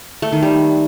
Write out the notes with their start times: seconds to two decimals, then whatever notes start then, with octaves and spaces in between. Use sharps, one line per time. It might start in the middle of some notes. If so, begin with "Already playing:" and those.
0.22 A3
0.32 D#3
0.42 G3